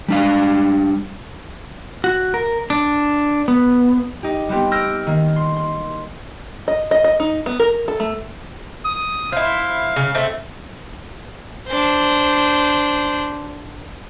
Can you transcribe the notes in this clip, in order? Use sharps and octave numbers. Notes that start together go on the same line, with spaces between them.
G3 D4 F5
F#4
A#4
D4
B3
D#4 G4
G3 B3 C4 G4
E6 F6 G6 A#6 D7
D#3 A#3
C6
C6
D#5
D#5
D#5
D#4
B3
A#4
A4
A3
D#6
E4 C5 F5
C#3
A3 C4
D4 C5